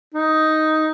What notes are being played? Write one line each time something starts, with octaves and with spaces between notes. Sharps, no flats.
D#4